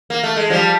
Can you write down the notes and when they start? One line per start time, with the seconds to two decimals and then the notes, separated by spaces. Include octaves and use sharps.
0.10 A#3
0.24 A3
0.36 G#3
0.50 F3 G3